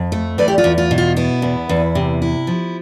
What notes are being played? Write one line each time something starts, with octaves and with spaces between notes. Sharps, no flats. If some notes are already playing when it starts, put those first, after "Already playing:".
Already playing: F2
A3
E2 B4 D5
G4
F4
E2
F4
B2
F4
B3 E4
E2
E2
C3
E4
F3